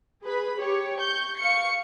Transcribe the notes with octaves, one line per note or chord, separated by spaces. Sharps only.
G#4 B4 B5
G4 C#5
C#6 G6
F5 C#6 C#7